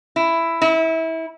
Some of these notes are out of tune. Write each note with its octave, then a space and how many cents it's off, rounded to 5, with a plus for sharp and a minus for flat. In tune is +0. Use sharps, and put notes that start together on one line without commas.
E4 +10
E4 -25